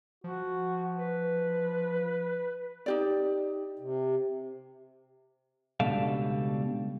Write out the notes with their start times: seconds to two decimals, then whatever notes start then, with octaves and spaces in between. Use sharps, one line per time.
0.24 F3 F#4
0.98 B4
2.86 D#4 G4 D5
3.79 C3
5.80 C#2 B2 G3 D4 A4 F5